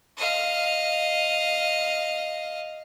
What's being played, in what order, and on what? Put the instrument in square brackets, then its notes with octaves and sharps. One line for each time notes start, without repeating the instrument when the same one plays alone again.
[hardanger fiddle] D#5 F5